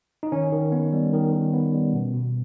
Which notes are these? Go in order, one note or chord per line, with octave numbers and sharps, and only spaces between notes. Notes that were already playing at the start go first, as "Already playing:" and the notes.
D#4
D#3 C#4
D#3
B3
G3
D#3
D#3
B3
G3
B2
B2